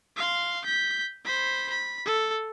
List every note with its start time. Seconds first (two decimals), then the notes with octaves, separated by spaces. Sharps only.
0.16 F5 C6
0.65 G6 B6
1.25 C5 B5
1.70 B5
2.06 A4